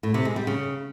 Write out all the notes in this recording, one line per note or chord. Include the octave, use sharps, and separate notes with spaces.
A2
C3
G#3
G3
C#3